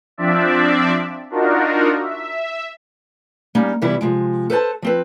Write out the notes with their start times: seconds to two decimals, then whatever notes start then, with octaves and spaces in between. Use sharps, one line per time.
0.18 F3 C4 D4 D5 E5
1.30 D4 D#4 F4 F#4 A#4
2.02 E5
3.55 G3 A#3 C#4 D#4
3.82 C3 E3 G3 B3 E4
4.01 C3 F3 G#3
4.50 A4 B4 C5 A5
4.82 F3 C4 B4